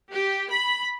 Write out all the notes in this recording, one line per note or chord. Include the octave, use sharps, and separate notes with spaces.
G4
B5